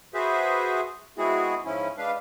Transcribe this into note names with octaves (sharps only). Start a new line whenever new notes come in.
F#4 G#4 B4 C5 E5
G#3 B3 C4 E4 F#4 G#4
G#2 F3 C#4 E4
G#3 D4 B4 F5